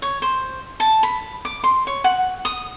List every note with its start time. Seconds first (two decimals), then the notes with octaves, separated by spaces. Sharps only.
0.02 C#5
0.22 C5
0.80 A5
1.03 B5
1.45 D6
1.64 C6
1.87 C#5
2.04 F#5
2.45 D#6